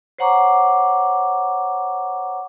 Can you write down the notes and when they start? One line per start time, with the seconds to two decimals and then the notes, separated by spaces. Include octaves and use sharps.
0.19 C5 C#5 F#5 A#5 C#6 D6